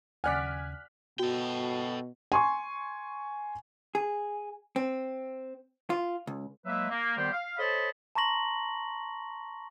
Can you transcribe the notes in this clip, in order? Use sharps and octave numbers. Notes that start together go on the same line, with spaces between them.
D#2 C#3 D5 F#5 G#5 F6 F#6 B6
B2 F#4 A4 G5
G#5 C6 C#6
G#4
C4
F4
C#2
F#3 G#3 A#3 B4 E5
A#3
D#3 G3 B3 G4 C5
F5
A4 C5 C#5 D#5 A5 B5
A5 A#5 C6 C#6 A#6 F#7